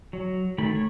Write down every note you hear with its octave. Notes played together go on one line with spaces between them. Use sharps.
F#3
D#3 A3 B5
C#5